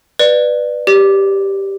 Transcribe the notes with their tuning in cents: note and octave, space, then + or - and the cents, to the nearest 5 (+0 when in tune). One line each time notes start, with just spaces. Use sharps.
B4 +0 D5 +20
G4 +0 D5 -45